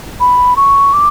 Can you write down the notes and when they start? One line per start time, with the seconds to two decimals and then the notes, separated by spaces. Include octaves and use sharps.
0.20 B5
0.56 C#6
0.93 D6